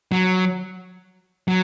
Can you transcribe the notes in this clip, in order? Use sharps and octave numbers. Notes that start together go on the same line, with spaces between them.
F#3
F#3